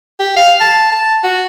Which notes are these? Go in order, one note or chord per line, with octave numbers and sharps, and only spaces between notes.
G4
F5
A5
A5
F#4